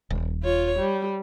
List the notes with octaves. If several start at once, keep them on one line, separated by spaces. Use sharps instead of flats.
D#1
F4 C#5
G3